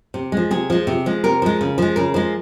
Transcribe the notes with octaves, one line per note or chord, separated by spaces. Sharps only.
C3
F3 G#3
C3 G#4
F3 G#3
C3
F3 G#3
C3 A#4
F3 G#3
C#3
F3 G#3
C#3 A#4
F3 G#3